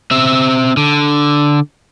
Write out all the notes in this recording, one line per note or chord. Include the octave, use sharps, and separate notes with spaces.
C4 E5
D3